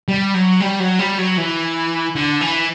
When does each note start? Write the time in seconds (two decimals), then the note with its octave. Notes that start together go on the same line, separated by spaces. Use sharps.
0.08 G3
0.34 F#3
0.60 G3
0.80 F#3
0.99 G3
1.18 F#3
1.38 E3
2.15 D3
2.41 E3